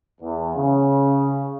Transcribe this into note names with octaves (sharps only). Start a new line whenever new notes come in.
E2
C#3